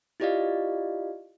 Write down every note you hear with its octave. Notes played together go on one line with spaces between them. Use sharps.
E4 F4 G4 D5 D#5 F5